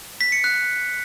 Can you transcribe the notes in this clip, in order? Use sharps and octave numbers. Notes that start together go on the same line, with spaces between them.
B6
C#7
F#6